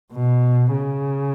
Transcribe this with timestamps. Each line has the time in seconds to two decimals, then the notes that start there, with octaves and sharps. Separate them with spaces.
0.12 B2
0.73 C#3